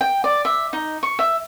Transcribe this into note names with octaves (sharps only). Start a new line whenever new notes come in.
G5
D5
E5
D#4
C#6
E5